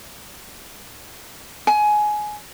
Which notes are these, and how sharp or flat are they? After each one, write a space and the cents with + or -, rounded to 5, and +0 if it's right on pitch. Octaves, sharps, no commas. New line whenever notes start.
G#5 +20